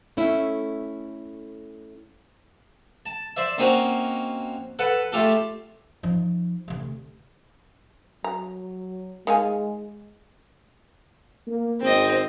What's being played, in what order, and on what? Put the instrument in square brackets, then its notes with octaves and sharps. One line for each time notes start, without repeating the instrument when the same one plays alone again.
[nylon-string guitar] A3 C#4 E4
[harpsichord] A5
C5 D5 E5
A#3 C4 C#4 D#4 F#4
A4 B4 F#5
A3 F4 G4 A4
[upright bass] F3 D#4
D2 C3
[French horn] F#3 [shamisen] A#5
[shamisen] D#3 F5 G#5 [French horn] G#3
[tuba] A#3
[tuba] G#1 [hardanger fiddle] C4 D#5